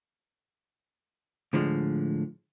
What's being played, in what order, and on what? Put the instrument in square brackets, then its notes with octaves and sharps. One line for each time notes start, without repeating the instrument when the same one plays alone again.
[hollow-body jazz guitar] A2 D3 F3 G#3